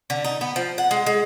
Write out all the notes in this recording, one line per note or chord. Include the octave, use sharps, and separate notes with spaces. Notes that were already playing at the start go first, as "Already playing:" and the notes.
D3
D#4
B3
F3
F#5
G#3
G#3